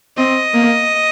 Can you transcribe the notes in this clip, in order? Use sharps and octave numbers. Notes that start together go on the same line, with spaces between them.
C4 D#5
A#3